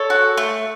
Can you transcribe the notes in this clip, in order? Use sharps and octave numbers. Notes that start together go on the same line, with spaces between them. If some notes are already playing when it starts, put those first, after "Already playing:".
Already playing: A4 C#5
F#4
A3